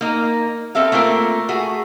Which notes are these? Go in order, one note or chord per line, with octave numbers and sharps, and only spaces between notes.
A#3 D#4
B3 C4 A4 E5 F5
A3 A#3 C4 F4 A#4
A3 F#4 G#4